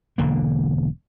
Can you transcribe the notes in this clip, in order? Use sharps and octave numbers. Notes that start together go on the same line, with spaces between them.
E1 D3 A#3